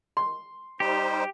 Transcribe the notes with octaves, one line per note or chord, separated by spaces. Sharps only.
C6
G3 D#4 G4 C5